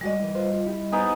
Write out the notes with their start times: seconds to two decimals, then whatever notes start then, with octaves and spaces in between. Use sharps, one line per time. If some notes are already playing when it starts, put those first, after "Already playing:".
0.01 G3 G#3 F#4 D5 D#5
0.20 E3 E4
0.35 F4 B4 C5
0.53 F4
0.66 E4 G4
0.92 B3 D#4 G#5